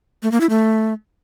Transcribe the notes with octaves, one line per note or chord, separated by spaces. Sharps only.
A3
A#3
E4
A3